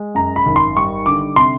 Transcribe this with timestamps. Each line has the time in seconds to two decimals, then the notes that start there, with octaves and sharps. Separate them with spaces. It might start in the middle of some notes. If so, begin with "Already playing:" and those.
Already playing: G#3
0.15 F#2 A#5
0.36 B5
0.46 G#1
0.56 C6
0.76 G3 C#6
1.06 D3 D6
1.36 C3 C6